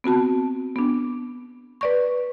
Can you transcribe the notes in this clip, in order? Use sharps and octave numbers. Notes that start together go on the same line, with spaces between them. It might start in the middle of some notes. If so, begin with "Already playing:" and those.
B3 C4 F#4 A5
B3 D4
B4 D5 C#6